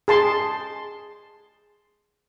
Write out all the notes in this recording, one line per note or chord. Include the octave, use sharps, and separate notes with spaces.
G#4 A5 C6